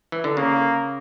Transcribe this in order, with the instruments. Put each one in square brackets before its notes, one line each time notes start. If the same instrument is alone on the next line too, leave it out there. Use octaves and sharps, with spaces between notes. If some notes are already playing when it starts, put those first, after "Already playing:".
[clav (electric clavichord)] E3
D3
[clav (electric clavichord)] C#3 [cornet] A#3